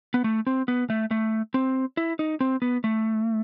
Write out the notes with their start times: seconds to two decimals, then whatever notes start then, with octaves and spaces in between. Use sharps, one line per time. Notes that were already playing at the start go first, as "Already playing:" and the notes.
0.14 B3
0.24 A3
0.47 C4
0.68 B3
0.90 A3
1.11 A3
1.54 C4
1.97 E4
2.19 D#4
2.40 C4
2.62 B3
2.84 A3